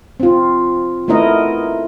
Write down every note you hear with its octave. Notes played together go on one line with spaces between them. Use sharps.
C4 F4
A3 B3 E4 A#4 D#5